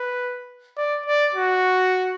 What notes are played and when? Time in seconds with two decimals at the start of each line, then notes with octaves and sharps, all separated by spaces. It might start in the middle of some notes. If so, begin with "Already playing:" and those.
Already playing: B4
0.77 D5
1.06 D5
1.35 F#4